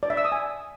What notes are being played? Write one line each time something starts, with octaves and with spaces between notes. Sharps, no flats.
D5
E5
E6
D#6
G#5